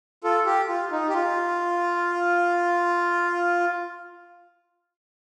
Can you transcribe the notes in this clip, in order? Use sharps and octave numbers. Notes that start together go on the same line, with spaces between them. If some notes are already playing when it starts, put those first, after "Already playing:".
F4 A4
G4
F4
D#4
G4
F4